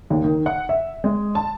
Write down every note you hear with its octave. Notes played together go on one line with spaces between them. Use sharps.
D#2
D#3
F#5
E5
G#3
A5